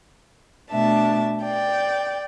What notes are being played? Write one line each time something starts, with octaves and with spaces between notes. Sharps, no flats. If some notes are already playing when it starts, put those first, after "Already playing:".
B2 A3 D4 E5 A5
D5 G5